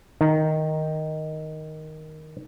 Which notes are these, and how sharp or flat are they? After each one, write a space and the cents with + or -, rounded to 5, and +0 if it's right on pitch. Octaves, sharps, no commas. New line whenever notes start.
D#3 +0 A#5 +0